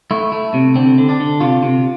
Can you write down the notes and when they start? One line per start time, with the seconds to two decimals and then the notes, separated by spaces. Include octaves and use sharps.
0.11 A3 E4
0.32 A3
0.54 C3
0.75 D3 C4
0.98 D3
1.09 D4
1.20 D3
1.41 C3 F4
1.63 C3